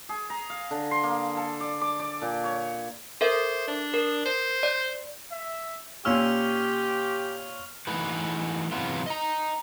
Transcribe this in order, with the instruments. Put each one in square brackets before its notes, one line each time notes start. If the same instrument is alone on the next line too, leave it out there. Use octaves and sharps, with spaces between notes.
[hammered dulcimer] G#4
A#5
F5
D3
C6
A#3
A4
D5
D6
D5
A#2
C#5
[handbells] A4 A#4 E5 [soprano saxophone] C5
[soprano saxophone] D4
[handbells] A#4
[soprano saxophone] C5
[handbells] D5
[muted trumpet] E5
[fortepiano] A#2 C#4 E6 [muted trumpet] G4 [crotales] C#6 F6 F7
[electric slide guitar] E3 A3 D#4 F#4 B4
C3 E3 F#3 B3 E4 F4
D#5 A#5